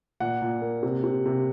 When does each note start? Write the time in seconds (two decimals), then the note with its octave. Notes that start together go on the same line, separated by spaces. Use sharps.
0.20 A#2 F#5
0.42 A#2
0.62 A#3
0.83 C3
1.03 C3
1.25 C3